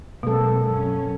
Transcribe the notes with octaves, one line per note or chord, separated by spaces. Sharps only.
B2 F#3 G#3 A#3 C4 A4
F#2 C#4